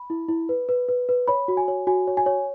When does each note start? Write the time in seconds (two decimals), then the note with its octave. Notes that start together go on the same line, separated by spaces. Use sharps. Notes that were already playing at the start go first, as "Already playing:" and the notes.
Already playing: B5
0.10 E4
0.28 E4
0.49 B4
0.69 B4
0.89 B4
1.09 B4
1.28 C#5 B5
1.48 F#4
1.57 G#5
1.68 C#5
1.87 F#4 G#5
2.08 C#5
2.17 G#5
2.26 C#5